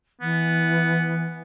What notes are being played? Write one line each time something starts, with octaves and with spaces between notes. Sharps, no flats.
E3 B3